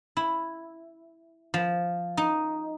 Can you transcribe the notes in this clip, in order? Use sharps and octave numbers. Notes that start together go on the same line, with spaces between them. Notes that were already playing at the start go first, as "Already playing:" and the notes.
E4
F3
D#4